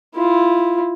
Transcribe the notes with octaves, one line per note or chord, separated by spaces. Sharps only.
E4 F4